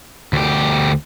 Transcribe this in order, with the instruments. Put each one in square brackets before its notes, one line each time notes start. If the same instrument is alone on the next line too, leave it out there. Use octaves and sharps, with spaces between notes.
[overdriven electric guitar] D2 G4